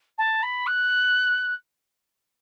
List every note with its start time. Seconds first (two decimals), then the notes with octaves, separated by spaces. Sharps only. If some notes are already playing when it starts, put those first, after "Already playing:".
0.18 A5
0.43 B5
0.66 F#6